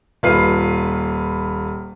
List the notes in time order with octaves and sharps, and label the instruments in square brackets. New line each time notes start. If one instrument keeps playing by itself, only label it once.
[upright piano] D#1 F4 B4 C7